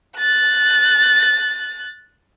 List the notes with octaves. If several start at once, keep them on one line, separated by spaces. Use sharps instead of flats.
F#6 A6